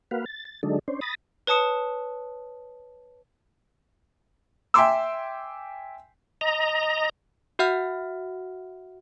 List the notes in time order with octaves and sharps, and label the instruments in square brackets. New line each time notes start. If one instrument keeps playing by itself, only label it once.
[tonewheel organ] A#3 F#4 B4 F5
A6
A6
D3 F#3 G#3 D4 D#4 A4
C#4 D4 C5
B5 D#6 A6 A#6
[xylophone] B4 C#5 A5 D#6 C#7 E7
[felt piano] E5 G5 G#5 C6 D6 E6
[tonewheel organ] D#5 A#5
[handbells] F#4 E5 F#5 F6